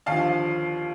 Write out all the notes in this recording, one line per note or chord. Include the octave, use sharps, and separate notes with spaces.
D#2 D3 F3 F5 A5